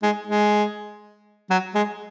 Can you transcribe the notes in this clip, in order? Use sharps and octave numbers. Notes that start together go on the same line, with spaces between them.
G#3
G#3
F#3
G#3